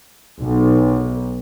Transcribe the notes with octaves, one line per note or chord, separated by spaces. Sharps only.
B1